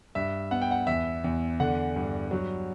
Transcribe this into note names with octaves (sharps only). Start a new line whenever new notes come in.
G2 E5
B3 F#5
G5
F#5
E2 E5
E2
D3 F#5
G2
F#3